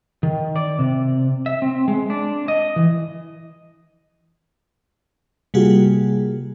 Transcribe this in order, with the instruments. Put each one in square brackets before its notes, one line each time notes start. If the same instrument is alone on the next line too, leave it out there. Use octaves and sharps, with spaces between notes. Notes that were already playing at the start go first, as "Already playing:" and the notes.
[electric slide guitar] D#3
D5
C3
E5
C4
G#3
D4
D#5
E3
[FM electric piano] C3 G3 A#3 F4 F#4 G#4